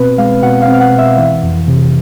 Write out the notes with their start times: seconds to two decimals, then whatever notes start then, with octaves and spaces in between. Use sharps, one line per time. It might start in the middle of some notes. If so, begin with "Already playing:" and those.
Already playing: B2 C4 B4
0.18 G#3 F5
0.43 B2 F#5
0.62 F5
0.68 C4
0.74 F5
0.81 F#5
0.93 B2
0.98 E5
1.18 E3
1.43 F2
1.68 C3